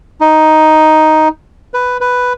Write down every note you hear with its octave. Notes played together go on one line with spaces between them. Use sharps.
D#4
B4
B4